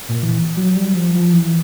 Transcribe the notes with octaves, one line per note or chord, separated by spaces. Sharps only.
A#2
E3
F#3
G3
F3
F3
E3